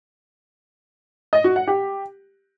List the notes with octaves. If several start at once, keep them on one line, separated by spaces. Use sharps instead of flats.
D#5
F#4
F#5
G4